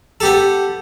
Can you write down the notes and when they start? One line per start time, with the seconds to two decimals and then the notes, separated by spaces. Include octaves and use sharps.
0.20 B3 G4 A4